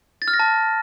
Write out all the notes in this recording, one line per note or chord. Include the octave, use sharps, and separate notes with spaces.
A6
F6
A#6
A5